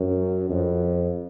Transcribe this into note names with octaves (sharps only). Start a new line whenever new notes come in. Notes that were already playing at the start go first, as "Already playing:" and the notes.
Already playing: F#2
F2